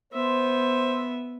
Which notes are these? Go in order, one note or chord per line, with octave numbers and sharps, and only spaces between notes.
B3 C5 E5